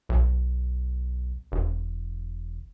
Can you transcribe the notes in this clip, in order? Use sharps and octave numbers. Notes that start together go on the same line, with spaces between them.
B1
E1